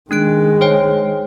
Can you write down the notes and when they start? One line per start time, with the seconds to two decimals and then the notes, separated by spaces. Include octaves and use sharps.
0.11 D#3 G#3 D4 F#6 D7
0.61 C5 C#5 G5